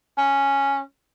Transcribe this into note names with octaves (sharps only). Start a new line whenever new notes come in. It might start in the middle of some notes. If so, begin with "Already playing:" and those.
C#4